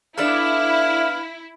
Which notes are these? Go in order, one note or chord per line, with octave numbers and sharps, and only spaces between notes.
B3 D4 E4 A4 D5 E5 F5